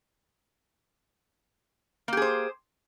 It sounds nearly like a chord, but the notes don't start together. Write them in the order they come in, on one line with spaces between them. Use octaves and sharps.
A#3 G4 G#4 C5